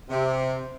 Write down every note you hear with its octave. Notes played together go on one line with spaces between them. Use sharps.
C3